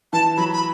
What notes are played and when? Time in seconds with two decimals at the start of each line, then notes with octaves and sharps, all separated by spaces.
0.13 E3 A5
0.37 F#3 B5
0.53 B5